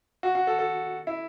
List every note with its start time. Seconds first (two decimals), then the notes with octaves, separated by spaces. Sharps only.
0.23 F#4
0.35 F#4
0.47 A4
0.59 A4
1.07 E4